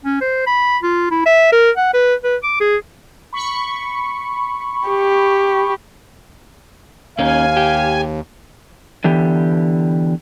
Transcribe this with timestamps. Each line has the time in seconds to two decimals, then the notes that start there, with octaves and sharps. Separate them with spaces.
0.05 C#4
0.21 C5
0.47 B5
0.83 F4
1.11 E4
1.26 E5
1.52 A#4
1.77 F#5
1.94 B4
2.24 B4
2.43 D6
2.61 G#4
3.33 B5 C#6
4.88 G4
7.19 D#2 A#3 C#4 D#4 F5 G#5
7.57 G4
9.04 D3 E3 B3 G4